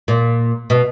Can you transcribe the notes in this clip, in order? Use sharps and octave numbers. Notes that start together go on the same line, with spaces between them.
A#2
B2